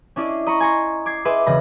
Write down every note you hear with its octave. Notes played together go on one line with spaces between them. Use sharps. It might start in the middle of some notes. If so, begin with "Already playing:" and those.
C#4 D4 E4 D5 D#5
D#5 A#5 B5 C#6
G#5 C6 C#6 A#6
D6 G#6 C7
G#4 B4 D#5 E5 C6 D6
E1 C#3 B5 A#6